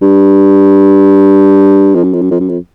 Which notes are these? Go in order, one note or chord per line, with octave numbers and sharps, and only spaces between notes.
G2
F2
F#2
F2
F#2
F2
F#2
F2